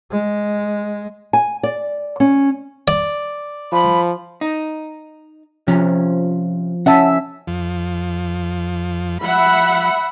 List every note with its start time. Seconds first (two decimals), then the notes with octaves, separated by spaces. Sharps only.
0.12 G#3
1.33 G#5
1.63 D5
2.20 C#4
2.88 D5
3.73 F3 B5
4.41 D#4
5.68 C3 F3 C#4
6.86 C#4 E5 F#5 A5
7.48 F2 F3
9.23 F3 E5 F#5 B5